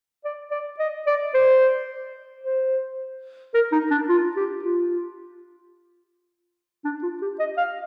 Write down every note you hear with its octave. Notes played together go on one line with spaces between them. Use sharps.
D5
D5
D#5
D5
C5
C5
A#4
D#4
D4
F4
G4
F4
D4
F4
G4
D#5
F5